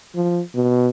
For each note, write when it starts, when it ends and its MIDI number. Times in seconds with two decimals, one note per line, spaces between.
0.15 0.41 53
0.55 0.89 47